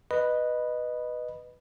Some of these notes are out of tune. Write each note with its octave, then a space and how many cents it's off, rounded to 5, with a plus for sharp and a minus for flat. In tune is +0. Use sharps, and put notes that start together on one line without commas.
B4 +0 D#5 -15 B5 -5